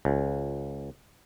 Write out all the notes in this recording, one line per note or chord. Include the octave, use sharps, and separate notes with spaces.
C#2